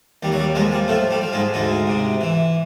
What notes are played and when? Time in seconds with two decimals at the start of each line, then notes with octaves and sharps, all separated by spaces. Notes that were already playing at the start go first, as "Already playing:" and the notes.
0.23 D#2 G3
0.32 F#3
0.39 G3
0.56 G#2 F3 G#3
0.72 G3
0.88 A2 F3 A3
1.11 G3
1.21 F3
1.33 G#2 G#3
1.54 D2 G#2 G#3
1.87 C3
2.21 E3